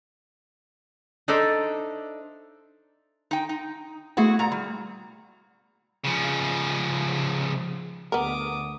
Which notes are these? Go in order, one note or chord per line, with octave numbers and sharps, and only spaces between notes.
D4 D#4 A4 C5 D5 E5
D#4 G5
D#4
A3 B3 E4 F#4 G#4
A#2 A#5
G3
C#3 F3
D2 B3 A#4 D6 D#6